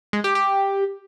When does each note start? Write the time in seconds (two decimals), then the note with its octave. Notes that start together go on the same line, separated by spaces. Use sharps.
0.13 G#3
0.24 G4
0.35 G4